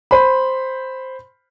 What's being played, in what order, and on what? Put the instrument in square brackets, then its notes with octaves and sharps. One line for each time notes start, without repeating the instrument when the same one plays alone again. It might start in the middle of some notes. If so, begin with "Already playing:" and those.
[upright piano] C5 B5